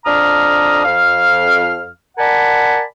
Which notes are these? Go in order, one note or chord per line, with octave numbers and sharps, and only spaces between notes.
F2 D4 A#5 D#6 F6
F2 F5 F6
A#4 D5 F#5 G#5 A5 B5